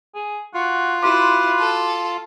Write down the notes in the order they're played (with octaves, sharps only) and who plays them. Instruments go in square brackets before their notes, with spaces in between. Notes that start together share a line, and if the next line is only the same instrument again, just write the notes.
[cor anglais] G#4
[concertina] F4 [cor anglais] F#4
[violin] E4 [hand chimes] F#4 C6 D6 [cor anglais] B4
[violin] A4